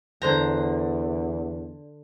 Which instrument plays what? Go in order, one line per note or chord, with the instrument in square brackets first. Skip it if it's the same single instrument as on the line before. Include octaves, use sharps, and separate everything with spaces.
[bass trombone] E2 [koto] D3 C5 A#5